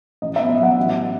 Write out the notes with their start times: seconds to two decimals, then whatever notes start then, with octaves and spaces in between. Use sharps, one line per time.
0.22 A1 D#5
0.36 E5
0.41 B3
0.49 E5
0.59 F#3 F#5
0.77 A1